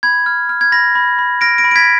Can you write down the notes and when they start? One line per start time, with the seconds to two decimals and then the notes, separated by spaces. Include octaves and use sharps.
0.03 B5 G#6
0.26 F6
0.49 F6
0.61 G#6
0.72 B5 A#6
0.95 B5
1.19 B5
1.41 F6 A#6 D7
1.58 A#6 D7
1.64 B5
1.71 D7
1.76 G#6 B6